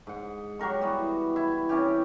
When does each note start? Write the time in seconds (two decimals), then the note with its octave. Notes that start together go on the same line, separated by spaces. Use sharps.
0.07 G#2 F#5
0.59 F#3 G4 A#4 C#6
0.81 E3 G3 B3 F#4
1.36 E4
1.69 C3 E3 C#4 G4